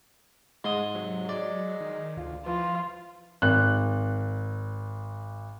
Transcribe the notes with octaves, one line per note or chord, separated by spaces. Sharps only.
G#2 G#3 C6 D#6
C3 F#3
G#3 D5
D#3
D2 F4
E3 F3 F4
G#1 F#6